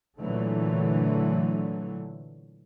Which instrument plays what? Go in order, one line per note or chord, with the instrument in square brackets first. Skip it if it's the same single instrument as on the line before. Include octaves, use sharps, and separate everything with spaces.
[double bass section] A#2 D3 E3 F#3 A3